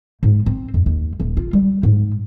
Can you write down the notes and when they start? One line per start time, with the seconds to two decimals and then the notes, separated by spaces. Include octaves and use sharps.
0.23 G#2
0.46 C4
0.74 F2
0.86 D#2
1.20 D#1
1.37 F4
1.53 G3
1.83 G#2